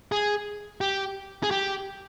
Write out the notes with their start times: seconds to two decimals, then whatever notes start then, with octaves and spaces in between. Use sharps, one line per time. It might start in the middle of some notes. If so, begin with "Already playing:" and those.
0.12 G#4
0.81 G4
1.43 G#4
1.51 G4